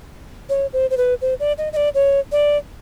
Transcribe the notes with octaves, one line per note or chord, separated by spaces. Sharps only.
C#5
C5
C5
B4
C5
D5
D#5
D#5
D5
C#5
D5